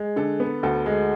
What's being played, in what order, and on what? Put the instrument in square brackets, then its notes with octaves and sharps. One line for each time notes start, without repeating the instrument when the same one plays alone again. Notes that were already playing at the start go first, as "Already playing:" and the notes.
Already playing: [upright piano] G#3
D3 A4
B3
D2 A4
G#3